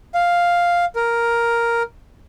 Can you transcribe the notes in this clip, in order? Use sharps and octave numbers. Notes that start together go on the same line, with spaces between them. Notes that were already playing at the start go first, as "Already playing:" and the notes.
F5
A#4